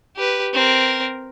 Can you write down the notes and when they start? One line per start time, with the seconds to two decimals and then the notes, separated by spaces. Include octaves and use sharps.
0.16 G4 B4
0.54 C4 A#4